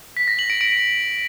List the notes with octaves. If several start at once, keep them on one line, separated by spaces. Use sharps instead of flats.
B6
A#6
F#7
D7
D7